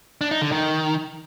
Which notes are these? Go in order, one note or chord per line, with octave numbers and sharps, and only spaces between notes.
D4
D#4
D3
D#3